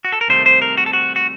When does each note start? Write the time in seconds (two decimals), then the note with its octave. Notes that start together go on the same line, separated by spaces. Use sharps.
0.05 F#4
0.12 A4
0.21 A#4
0.28 C2 C3 D#3 A3 C5
0.46 C5
0.62 A#4
0.77 F#4
0.86 A4
0.93 F#4
1.16 F#4